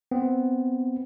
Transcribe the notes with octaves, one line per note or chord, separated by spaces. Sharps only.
B3 C4